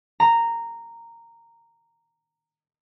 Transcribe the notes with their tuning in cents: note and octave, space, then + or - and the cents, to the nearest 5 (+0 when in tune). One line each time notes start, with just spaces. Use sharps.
A#5 -10